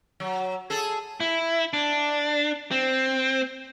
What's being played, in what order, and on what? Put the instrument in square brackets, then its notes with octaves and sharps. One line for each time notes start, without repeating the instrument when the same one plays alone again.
[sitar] F#3
G#4 A4
[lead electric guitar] E4
D4
C4